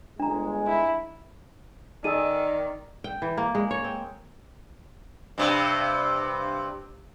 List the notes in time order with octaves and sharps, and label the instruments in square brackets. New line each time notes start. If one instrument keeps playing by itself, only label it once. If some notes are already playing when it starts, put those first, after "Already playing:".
[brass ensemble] G1 G#3 [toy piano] D4 A#5
[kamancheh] E4
[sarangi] D#3 [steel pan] D#4 G#4 A4 [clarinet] D5 [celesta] E6 D#7
[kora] G5
E3
A#3
G#3
C#5
C4
[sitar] G2 C3